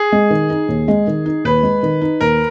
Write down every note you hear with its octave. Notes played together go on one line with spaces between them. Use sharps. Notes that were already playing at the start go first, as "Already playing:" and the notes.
Already playing: G#4
G#3
D#3
D#4
D#2
G#3
D#3
D#4
D#2 B4
G#3
D#3
D#4
D#2 A#4